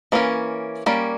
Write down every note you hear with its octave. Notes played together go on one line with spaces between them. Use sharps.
E3 A#3 C#4
G3 A#3 C#4